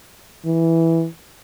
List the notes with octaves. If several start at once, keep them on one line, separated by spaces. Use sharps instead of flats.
E3